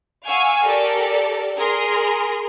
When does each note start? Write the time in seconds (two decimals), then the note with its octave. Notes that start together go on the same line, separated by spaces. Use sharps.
0.24 F5 F#5 G#5 C#6 E6
0.62 G4 A4 A#4 D5
1.56 G#4 A#4 C6